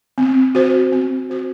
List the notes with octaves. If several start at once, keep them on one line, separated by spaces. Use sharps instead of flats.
C4
F#4 C5
C4
F#4 C5